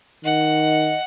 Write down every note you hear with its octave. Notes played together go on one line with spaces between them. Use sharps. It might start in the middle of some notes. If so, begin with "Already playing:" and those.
D#3 D#5 F#5